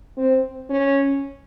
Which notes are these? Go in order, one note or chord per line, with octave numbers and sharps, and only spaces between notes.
C4
C#4